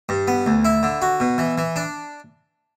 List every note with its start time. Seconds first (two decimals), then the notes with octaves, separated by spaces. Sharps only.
0.09 G2
0.28 B3
0.46 D2
0.65 E4
0.83 D3
1.02 F#4
1.20 B2
1.38 E3
1.58 E3
1.76 D4